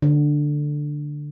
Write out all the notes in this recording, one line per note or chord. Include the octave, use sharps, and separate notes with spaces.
D3